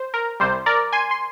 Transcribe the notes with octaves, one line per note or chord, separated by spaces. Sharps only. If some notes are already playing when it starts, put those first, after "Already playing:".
Already playing: C5
A#4
C2 C3 G3 C5
A#4 D5
G#5 C6
C6